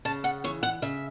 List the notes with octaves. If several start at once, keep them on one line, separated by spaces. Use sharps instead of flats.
C#3 A5
F#5
E3 C#5
F#5
C#3 E5